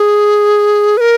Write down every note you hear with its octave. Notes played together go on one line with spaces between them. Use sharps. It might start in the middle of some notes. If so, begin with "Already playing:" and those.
Already playing: G#4
B4
A#4